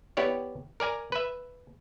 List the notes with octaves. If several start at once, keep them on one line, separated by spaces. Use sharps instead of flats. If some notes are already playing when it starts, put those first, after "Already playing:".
B3 E4 G4 C#5 D5
A#4 D5 G#5 A#5
B4 E5